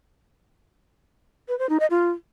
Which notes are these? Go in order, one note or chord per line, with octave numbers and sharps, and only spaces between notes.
B4
C5
D#4
D#5
F4